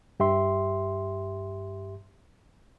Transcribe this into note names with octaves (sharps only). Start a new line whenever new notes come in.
G2 G4 E5 C6